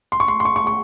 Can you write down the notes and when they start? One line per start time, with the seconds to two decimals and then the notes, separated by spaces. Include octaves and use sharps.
0.12 C6
0.20 C#6
0.28 C6
0.40 C6
0.45 C#6
0.56 C#6
0.67 C#6